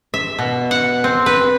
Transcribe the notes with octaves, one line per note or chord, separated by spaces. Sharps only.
E5
B2
F#5
C4
B4